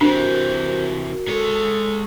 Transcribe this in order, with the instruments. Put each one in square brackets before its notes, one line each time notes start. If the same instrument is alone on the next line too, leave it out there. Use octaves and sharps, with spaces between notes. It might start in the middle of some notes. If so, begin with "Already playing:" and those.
[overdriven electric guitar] C3 E3 [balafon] D4 [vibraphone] F#4 A#4 [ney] C5
[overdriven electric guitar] G#3 C#5 [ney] A4